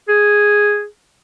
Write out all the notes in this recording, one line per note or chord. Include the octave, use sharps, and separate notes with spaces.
G#4